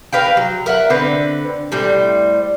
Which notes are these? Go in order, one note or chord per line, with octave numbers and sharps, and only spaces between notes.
A#4 B4 F5 G5
F#3
A#4 E5 F#5
D3 C4 B4
A2 G3 C4